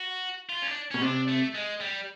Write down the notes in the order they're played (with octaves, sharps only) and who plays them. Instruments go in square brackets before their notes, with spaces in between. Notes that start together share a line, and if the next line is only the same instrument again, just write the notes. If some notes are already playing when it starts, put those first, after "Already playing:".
Already playing: [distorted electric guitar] F#4
F4
C#4
D4
[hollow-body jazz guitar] B2 [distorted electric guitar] C#4
[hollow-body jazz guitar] C3 [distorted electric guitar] D4
[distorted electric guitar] A3
G#3
G3